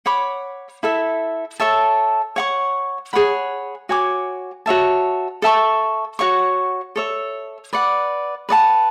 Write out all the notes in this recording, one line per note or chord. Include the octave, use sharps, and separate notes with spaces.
C#5 F#5 B5 D6
E4 A4 E5
A4 C#5 E5 A5
C#5 F#5 C#6
G#4 C#5 F#5 B5
F#4 C#5 G#5 D6
F#4 C#5 E5 A5
A4 E5 A5 C#6
F#4 C#5 F#5 C#6
A4 C#5 E5
B4 D5 F#5
B4 D5 F#5 A5